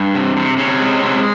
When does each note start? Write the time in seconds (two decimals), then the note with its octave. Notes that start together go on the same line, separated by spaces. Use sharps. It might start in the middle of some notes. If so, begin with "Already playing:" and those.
Already playing: G2
0.15 C3
0.36 C3
0.57 C3 C#4
0.80 G#3
1.02 C3